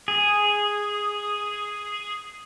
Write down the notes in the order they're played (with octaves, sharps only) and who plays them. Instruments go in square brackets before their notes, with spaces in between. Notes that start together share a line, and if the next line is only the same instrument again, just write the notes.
[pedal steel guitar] G#4 [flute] D#6